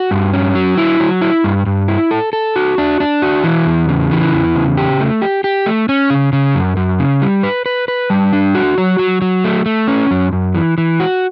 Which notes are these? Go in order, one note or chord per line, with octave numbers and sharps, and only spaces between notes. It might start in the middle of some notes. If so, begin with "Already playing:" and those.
Already playing: F#4
G2
C#4
F#3
E4
F#3
E4
G2
G2
E4
A4
A4
F#4
D4
D4
F#4
E3
E2
C#3
E3
E2
C#3
G4
A3
G4
G4
A3
C#4
C#3
C#3
F#2
F#2
C#3
G3
B4
B4
B4
G3
D4
F#4
F#3
F#3
F#3
A3
A3
C#4
F#2
F#2
E3
E3
F#4